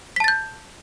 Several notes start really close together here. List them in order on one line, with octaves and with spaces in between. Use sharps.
B6 A5 A6 G6